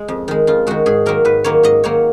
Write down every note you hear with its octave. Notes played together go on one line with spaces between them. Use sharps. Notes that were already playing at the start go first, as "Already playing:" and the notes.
Already playing: G#3
F2
D#3 G#3
F2 F4
D#3 G#3 F#4
G#2 G#4
D#3 F#3 A#3 A#4
G#2 B4
D#3 F#3 A#3 C#5
G#2 D#5
D#3 F#3 A#3 C#5